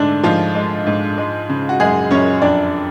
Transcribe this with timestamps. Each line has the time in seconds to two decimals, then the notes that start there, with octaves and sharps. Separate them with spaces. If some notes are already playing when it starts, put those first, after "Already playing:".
Already playing: G#2 D3 A3 D4
0.24 G#2 F3 F4
0.55 G#3
0.87 G#2
1.18 G#3
1.49 C#3
1.69 F#4
1.80 F#2 G#3 G#4
2.11 F#2 C#4 C#5
2.42 F2 D4 D5